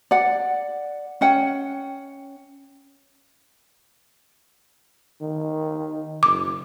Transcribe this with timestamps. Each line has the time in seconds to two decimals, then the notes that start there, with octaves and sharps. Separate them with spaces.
0.11 D5 F#5
1.21 C#4 F#5 G5
5.21 D#3
6.23 F#1 D6